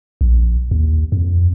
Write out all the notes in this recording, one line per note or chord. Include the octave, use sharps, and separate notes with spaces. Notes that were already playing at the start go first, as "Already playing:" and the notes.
A#1
D#2
F2